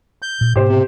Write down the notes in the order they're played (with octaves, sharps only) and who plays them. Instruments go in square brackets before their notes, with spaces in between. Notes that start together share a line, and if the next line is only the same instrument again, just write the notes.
[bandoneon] G6
[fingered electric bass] A#2
[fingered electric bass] G#2 B2 B3 [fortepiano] G4 C5
[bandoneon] C3